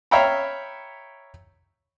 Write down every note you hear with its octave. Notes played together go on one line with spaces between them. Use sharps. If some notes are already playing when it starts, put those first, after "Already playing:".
C#5 E5 F5 G5 A#5 B5